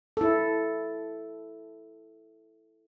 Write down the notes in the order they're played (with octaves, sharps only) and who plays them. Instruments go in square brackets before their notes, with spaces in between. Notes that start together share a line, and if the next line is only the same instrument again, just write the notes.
[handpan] E4 A4